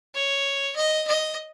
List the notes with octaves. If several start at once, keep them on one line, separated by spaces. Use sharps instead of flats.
C#5
D#5
D#5